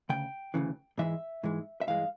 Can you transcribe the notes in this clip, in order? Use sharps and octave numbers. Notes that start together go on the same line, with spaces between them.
D2 C#3 G5
D2 C#3 E3
G#2 E3 G#3 E5
G#2 E3 G#3
E5
G2 E3 G#3 F5